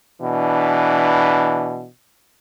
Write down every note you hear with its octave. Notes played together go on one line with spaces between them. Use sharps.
B2 E3 D4